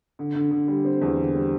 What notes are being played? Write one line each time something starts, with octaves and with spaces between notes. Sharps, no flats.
D3
D3
D3
G3
C4
E2
D3
G3